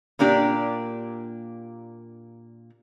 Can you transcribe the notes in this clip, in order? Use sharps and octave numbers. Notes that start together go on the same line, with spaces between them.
A#2 A#3 D4 G4